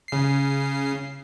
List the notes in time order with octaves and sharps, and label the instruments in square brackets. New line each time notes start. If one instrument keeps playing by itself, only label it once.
[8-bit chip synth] C#3 C7